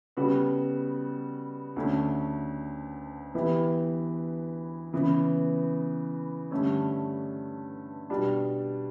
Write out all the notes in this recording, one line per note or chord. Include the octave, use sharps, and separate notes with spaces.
C#3 G3 B3 F#4 A4
D2 D3 A3 C#4
E3 B3 E4 G4
C#3 E3 B3
G2 D3 A3 C#4
B2 G3 D4